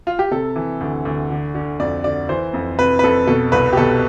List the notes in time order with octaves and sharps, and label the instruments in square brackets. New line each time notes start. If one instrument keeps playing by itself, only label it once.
[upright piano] F4
G4
C3 A4
E3
D2
D2
D3
D3
F2 D5
D3 D5
E3 C5
F2
C3 B4
B4
F2 A4
B2 A4
C2 B4
G4
B2 A4